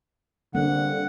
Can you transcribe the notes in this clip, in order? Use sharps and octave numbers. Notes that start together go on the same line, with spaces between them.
D3 G3 A#3 C4 F#5